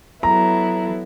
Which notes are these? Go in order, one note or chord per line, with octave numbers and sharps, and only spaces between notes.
F#3 B3 E4 A4 A#5